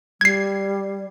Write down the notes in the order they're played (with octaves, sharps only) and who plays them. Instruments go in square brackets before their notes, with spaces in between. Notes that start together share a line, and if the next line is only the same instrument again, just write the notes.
[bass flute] G3 [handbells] G#6 C7